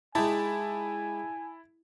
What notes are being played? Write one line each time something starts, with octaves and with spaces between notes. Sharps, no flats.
G#3 D#4 E4 G4 G#5 A5